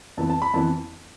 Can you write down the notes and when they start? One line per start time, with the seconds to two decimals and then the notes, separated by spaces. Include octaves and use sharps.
0.17 F2 E3 B3 A5
0.30 A5
0.42 B5
0.54 F2 E3 B3 A5